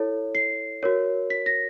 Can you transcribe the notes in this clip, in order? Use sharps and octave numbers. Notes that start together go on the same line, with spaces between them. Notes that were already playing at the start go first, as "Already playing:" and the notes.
Already playing: E4 A4 C#5
C7
F#4 A#4 C#5
B6
A#6